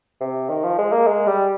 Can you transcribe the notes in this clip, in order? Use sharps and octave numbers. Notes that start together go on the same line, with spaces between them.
C3
D#3
F3
G#3
A#3
G#3
G3